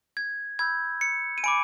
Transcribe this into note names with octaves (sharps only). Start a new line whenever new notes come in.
G#6
B5 E6 G6 G#6
C#7
D#7
G#5 B5 D6 D7